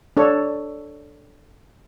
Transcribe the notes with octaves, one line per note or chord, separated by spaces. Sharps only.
D4 A4 C#5